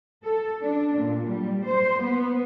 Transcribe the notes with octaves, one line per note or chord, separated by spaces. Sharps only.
A4
D4
A#2
G3
C5
B3